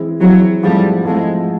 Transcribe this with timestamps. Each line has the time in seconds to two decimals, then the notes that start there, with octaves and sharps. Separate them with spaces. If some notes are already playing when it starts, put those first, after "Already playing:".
Already playing: E3 G#3 C4 E4
0.20 E3 F#3 G#3 C4 E4
0.63 G#2 F3 G3 A3 C4 E4
1.05 G#2 F3 G#3 A3 C4 E4